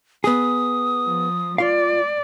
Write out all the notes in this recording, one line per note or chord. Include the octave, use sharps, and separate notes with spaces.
B3 G#4 D#6
F3
F4 D5 F5